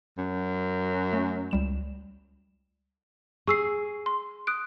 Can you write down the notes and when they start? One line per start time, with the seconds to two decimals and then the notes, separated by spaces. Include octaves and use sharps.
0.18 F#2
1.13 A3
1.51 C#2 G3 E7
3.47 G#4 C#6 E6 C7
4.06 C6
4.47 D#6 F#6 D7